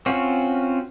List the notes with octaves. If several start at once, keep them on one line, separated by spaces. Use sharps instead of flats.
C4 C#4 F4 F#4